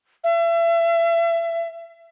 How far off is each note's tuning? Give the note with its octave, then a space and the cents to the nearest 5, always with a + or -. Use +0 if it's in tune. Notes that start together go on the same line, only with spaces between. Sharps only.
E5 +35